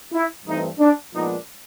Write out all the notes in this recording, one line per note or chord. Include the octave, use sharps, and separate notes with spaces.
E4
G2 E3 A3 C4 D#4
D4
A#2 F3 G#3 B3 D4 D#4